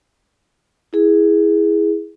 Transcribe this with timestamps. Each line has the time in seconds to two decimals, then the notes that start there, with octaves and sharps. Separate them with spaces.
0.93 E4 G#4